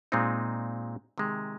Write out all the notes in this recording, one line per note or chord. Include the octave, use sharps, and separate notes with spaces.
A#2 G#3 C4 D#4
C3 D#3 G#3